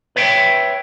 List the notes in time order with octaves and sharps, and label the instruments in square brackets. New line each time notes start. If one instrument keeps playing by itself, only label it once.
[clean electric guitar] B4 C#5 E5 G5